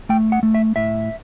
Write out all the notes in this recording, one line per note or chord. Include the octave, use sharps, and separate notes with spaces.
A3 G5
F#5
A3
E5
A2 E5